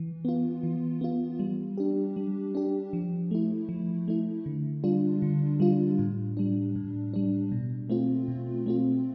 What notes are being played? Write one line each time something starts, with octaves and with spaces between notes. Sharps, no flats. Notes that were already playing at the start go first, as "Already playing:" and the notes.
Already playing: E3
B3 F4
E3
B3 F4
G3
D4 G4
G3
D4 G4
F3
A3 E4
F3
A3 E4
D3
G3 D4 F4
D3
G3 D4 F4
A2
G3 D4
A2
G3 D4
B2
A3 C4 F4
B2
A3 C4 F4